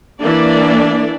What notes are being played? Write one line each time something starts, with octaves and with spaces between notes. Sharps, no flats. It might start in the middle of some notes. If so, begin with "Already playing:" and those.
E3 A#3 D4 D5